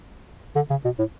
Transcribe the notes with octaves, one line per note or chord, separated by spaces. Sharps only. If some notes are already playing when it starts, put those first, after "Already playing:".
D3
C#3
B2
A2